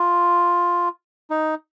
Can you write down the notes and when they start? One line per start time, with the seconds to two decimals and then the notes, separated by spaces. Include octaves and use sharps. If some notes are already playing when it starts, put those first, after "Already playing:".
Already playing: F4
1.30 D#4